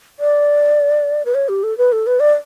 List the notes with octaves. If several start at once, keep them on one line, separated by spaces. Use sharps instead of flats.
D5
B4
C#5
G4
A4
B4
A4
B4
D5